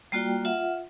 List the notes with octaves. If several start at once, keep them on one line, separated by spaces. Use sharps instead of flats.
G3 A#3 F4 F#4 D5 G5
F4 E5 F#5